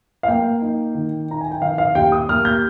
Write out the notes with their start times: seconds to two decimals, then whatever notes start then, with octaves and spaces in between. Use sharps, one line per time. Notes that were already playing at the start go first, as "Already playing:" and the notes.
0.23 F5
0.28 A#3 G5
0.61 D#4
0.95 D#3
1.29 D#4 A#5
1.41 G#5
1.51 G5
1.62 D#3 F5
1.78 F5
1.95 D#2 G5
2.12 D#6
2.29 A#3 F6
2.45 G6